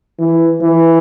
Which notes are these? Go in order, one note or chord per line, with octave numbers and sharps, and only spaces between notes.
E3
E3